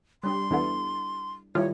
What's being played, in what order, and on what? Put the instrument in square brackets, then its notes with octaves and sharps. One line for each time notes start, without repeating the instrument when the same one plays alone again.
[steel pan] G3 D4 G4 [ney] C6
[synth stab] E2 B3 [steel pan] D4 E4 A4
[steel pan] D#3 G3 E4 [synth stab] F4 [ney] C#5